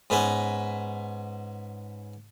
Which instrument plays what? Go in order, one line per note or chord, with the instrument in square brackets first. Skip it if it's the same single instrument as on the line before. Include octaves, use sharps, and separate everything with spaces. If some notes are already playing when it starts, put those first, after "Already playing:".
[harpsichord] G#2 B3 C#4